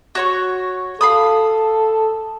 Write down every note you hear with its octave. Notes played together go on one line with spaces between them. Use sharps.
F#4 C#5 C#6
A4 F5 B5 D#6